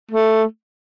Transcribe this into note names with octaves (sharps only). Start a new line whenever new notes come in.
A3